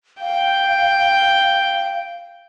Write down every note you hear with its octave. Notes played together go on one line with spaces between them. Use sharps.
F5 G5